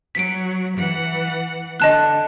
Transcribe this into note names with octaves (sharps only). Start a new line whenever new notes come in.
F#3 B6 D7
E3 F#5
D3 D#5 A5 F#6